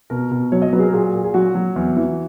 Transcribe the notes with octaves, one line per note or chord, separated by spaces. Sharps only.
B2 A#4
B2
F#3 C#5
D#5
F#3 B4
G#4
A#4
A#2 G#4
A#2
G#4
F#3 F#4
F#3
E2
E3